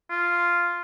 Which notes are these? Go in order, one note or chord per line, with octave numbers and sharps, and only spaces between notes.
F4